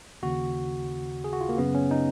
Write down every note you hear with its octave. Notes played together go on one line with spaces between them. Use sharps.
D#2 C#3 F#4
G#4
F#4
F4
A#3
F#2 C#3 B3
C#4
D#4